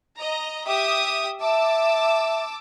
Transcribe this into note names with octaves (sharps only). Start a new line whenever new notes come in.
D#5 A#5
G4 E5 D#6
E5 A5 D6 E6